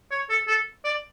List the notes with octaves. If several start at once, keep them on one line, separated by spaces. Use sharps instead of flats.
C#5
A4
A4
D5